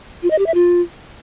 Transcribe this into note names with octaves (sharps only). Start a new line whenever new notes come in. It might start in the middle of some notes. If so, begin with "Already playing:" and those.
F4
D#5
G4
E5
F4